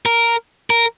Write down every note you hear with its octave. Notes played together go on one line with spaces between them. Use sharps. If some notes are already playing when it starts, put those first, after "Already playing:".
A#4
A#4